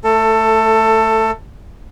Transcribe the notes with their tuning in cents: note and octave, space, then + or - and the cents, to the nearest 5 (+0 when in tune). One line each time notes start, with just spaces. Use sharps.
A3 +0 A4 +20